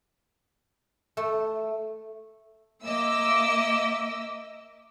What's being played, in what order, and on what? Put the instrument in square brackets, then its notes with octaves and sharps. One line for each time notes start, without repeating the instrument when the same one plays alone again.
[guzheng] A3
[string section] A#3 D#5 E6 [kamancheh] E5 D6